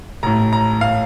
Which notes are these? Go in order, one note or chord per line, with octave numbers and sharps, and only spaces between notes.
A1 A2 A#5
A#5
A2 F5